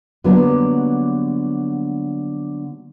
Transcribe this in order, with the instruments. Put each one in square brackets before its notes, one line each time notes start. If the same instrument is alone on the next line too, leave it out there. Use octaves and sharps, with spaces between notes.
[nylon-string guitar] D3 F#3 G3 A#3 B3 D4